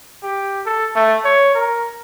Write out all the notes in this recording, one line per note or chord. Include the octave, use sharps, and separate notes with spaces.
G4
A4
A3
C#5
A#4